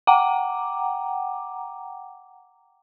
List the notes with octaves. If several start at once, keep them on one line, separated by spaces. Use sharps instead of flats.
F#5 G5 A#5 D6